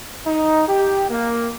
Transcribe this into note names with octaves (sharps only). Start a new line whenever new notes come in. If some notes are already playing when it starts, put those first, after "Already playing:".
D#4
G4
A#3